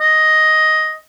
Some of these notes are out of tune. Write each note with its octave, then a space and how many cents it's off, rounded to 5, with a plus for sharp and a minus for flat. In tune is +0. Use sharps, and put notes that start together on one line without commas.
D#5 +5